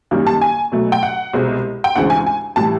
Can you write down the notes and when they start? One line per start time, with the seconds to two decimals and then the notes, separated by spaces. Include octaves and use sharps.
0.11 F#2 D#3 G3 A#3 C#4
0.27 A5
0.41 G#5
0.72 B2 F#3 A3
0.92 G5
1.03 F#5
1.34 C2 B2 G#3 C4
1.84 G5
1.96 D2 C#3 E3 G#3 C4 F#5
2.10 G#5
2.26 G#5
2.56 A2 E3 G3 A5